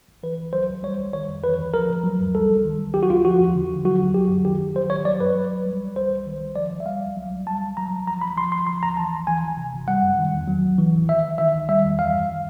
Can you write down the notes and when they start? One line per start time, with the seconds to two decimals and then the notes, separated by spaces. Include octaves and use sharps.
0.08 G1
0.23 E3 B4
0.38 C2
0.53 F#3 C5
0.69 D2
0.83 G3 C#5
0.99 A#1
1.13 D#3 C#5
1.28 F2
1.44 E3 B4
1.59 D2
1.74 F3 A#4
1.90 D2
2.04 F#3
2.20 F#2
2.35 G3 A4
2.49 C#2
2.64 D#3
2.79 A#1
2.94 F#3 G4
3.03 F#4
3.10 D2 F4
3.25 F3 F#4
3.40 E2
3.55 D3
3.70 G1
3.84 F#3 F#4
4.01 C#2
4.14 F#3 G4
4.30 F#2
4.45 D#3 G4
4.60 G#1
4.75 F#3 C5
4.90 A1 C#5
5.05 F#3 D5
5.20 F#2 B4
5.35 F#3
5.51 A#1
5.66 G3
5.80 C2
5.96 G3 C5
6.11 C2
6.26 D#3
6.42 G#1
6.56 F3 D5
6.71 D2
6.80 E5
6.86 G3 F5
7.02 C2
7.17 F#3
7.31 B1
7.46 G3 A5
7.62 B1
7.77 F#3 A#5
7.91 C#2
8.07 F3 A#5
8.21 C2 B5
8.37 F3 C6
8.52 A1 C6
8.67 F3 C6
8.83 D2 A#5
8.97 E3 A5
9.12 G#1
9.27 E3 G#5
9.43 G#1
9.57 C3
9.73 G1
9.88 G3 F#5
10.02 F#2
10.19 D#3
10.34 E2
10.48 F#3
10.63 B1
10.78 E3
10.93 A1
11.09 D#3 E5
11.24 G1
11.38 D#3 E5
11.54 D2
11.69 G3 E5
11.83 E2
11.99 E3 F5
12.14 F#2
12.29 D#3